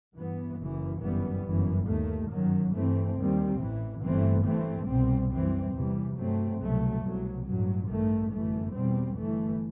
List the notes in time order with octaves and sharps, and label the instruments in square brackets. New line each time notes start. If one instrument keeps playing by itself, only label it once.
[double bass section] G2 E3 B3
F#1 F#2 E3
G1 F#2 E3 G3 B3
G1 F#2 E3
D#2 D#3 A3
G1 F#2 D#3 F#3
G2 E3 A3 C4
D#2 D#3 G3 C4
A1 A2 E3
G1 G2 E3 A3 C4
G2 E3 A3 C4
C2 B2 G3 C4
F#2 E3 G3 C4
E2 C3 E3 G3
G2 F#3 A3 C4
C2 B2 F#3 A3
C2 B2 F#3
A1 G2 F#3
A1 G2 D#3 A3
G1 F#2 E3 A3
E2 B2 G3 C4
G1 G2 E3 A3